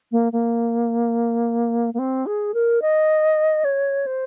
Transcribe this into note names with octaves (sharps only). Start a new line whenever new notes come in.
A#3
A#3
A#3
C4
G#4
A#4
D#5
C#5
C5